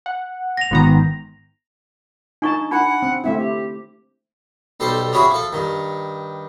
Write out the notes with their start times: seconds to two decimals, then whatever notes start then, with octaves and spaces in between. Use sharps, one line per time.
0.06 F#5
0.57 A#6 F7
0.71 G#1 G#2 D#3 B3 A#5
2.42 D4 D#4 A5 C#6
2.71 D4 F#5 B5
3.02 C4
3.24 A3 C4 E4 E5
3.38 G4
4.80 B1 G3 A4 C5
5.12 C3 C#4 E4 F#4 G#4 B4
5.30 F3 A4
5.53 G2 D#3